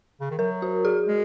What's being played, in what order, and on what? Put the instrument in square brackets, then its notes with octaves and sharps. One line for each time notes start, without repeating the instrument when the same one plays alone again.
[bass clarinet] C#3
D#3
[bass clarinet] F#3 [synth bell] A#4
[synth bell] F#4
G#4
[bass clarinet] G#3